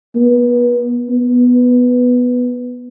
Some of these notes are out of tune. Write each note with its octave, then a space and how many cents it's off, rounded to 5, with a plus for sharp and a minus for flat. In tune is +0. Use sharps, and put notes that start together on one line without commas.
B3 -30
B3 +0